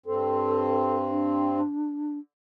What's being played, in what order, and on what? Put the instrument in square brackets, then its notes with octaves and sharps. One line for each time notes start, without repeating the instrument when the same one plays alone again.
[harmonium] G2 C4 [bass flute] A4
[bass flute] D4